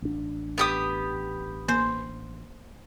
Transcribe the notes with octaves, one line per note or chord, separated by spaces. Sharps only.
A1 D4
B3 G4 D#6
A#3 C5